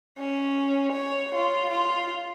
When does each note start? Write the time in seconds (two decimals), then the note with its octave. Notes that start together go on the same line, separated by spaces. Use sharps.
0.19 C#4
0.93 C#5
1.35 F4
1.70 F4